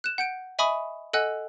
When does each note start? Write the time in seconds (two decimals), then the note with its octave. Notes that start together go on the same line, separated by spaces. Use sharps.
0.04 F#6 E7
0.18 F#5 G6 D7
0.59 D#5 E5 G#5 B5 C#6 D#6
1.13 A4 D#5 F#5 G#5 E6 F#6